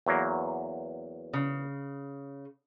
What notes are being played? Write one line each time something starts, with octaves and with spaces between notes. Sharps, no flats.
E2 F#3 A#3
C#3